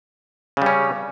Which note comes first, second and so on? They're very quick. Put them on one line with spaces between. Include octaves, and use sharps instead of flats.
C#3 G3 C#4